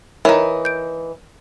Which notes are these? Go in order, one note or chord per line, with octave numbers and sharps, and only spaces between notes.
E3 D#4 A#4 C#5
G6 D7